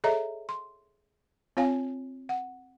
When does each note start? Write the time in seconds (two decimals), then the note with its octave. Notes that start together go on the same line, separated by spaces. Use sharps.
0.04 G#4 A4 C#5 D#5 E5 A#5
0.49 C6
1.57 C4 F4 C#5 F5 G#5
2.29 F#5